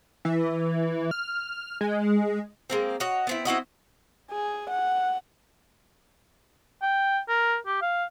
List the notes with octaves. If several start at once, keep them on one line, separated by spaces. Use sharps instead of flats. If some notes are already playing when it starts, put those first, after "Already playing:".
E3
F6
G#3
G#3 A#3 C4
F#4 C#5 D#5
B3 C4 E4
C4 E4 F#4 D#5
G#4
F#5
G5
A#4
G4
F5